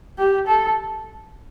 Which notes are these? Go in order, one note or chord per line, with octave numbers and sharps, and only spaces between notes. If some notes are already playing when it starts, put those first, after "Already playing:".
G4
A4